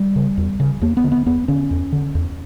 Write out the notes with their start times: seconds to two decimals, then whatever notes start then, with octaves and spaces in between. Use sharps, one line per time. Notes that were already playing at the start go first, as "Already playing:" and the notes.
Already playing: G3
0.16 C#3
0.37 E2
0.60 C#3
0.82 E2 A#3
0.97 B3
1.04 D3
1.12 B3
1.26 E2 B3
1.48 D3 C#4
1.71 E2
1.92 D3
2.15 E2